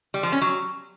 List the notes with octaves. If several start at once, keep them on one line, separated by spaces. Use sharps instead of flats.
G3
F3
C#4
F#3